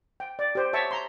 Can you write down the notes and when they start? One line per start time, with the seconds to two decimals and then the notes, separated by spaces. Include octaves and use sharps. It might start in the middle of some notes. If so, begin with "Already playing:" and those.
0.20 G5
0.39 D5
0.55 G4 C5
0.73 C#5 E5 A5 C#6
0.91 A#5 C6